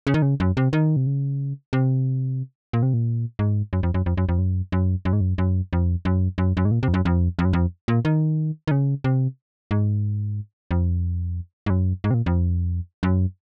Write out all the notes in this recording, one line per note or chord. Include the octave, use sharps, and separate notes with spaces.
C#3
D#3
C#3
F#2
C3
D#3
C3
C#3
C3
A#2
C3
A#2
G#2
F#2
F2
F#2
F2
F#2
F2
F#2
F#2
F#2
G#2
F#2
F#2
F2
F#2
F#2
F#2
G#2
A#2
C3
F2
F#2
F2
F2
F#2
F2
A#2
D#3
D#3
C#3
C3
G#2
F2
G#2
F#2
G#2
C3
A#2
F2
F#2